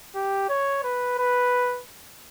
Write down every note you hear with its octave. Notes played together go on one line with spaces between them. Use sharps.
G4
C#5
B4
B4